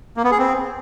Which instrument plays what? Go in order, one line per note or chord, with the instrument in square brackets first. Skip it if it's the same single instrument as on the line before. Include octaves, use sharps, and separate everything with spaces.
[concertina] A#3
B3
G#4
C4